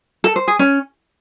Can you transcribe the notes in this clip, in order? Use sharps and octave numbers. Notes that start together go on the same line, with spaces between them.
A4
C5
G#4
C#4